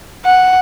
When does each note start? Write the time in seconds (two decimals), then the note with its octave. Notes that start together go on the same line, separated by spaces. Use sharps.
0.25 F#5